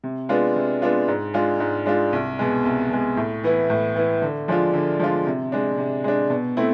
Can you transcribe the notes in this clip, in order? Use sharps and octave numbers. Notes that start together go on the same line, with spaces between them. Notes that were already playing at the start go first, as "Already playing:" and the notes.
C3
G#3 B3 D4 F4
C3
G#3 B3 D4 F4
G#2
G#3 D4 F4
G#2
G#3 D4 F4
C2
B2 G#3
C2
B2 G#3
A2
E3 B3 E4
A2
E3 B3 E4
D3
F3 G#3 D4 F4
D3
F3 G#3 D4 F4
C3
G#3 D4
C3
G#3 D4
B2
A3 C4 E4